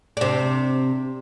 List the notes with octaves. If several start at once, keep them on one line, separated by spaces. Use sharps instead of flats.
C3 D4